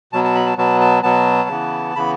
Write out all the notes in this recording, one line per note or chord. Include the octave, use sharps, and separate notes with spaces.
B2 F#3 B3 A5
A5
B5
A5
B2 F#3 B3 A5
A5
B2 F#3 B3 A5
C#3 E3 B3
C#3 E3 B3 B5